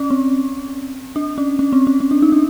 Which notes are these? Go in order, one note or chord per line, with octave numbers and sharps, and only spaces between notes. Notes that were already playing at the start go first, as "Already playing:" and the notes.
Already playing: C#4
C4
D4
C#4
C#4
C4
C#4
C#4
D4
D#4
D4